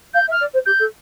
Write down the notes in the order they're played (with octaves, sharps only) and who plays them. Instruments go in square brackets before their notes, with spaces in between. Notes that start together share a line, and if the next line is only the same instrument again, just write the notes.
[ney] F5 [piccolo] G6
[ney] E5
[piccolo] F6
[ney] D5
C5
[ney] G4 [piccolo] G6
[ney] A4